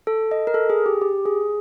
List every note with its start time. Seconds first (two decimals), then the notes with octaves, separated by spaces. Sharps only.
0.07 A4
0.31 D#5
0.47 A#4
0.54 A4
0.70 G#4
0.86 G4
1.02 G4
1.26 G#4